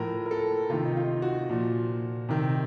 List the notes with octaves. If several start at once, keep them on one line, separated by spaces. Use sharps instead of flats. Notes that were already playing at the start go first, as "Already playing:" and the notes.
Already playing: A2 F3 A#4
A#4
A4
C3 D#3 F4
D#4
F4
F#4
A#2 F3
C3 D#3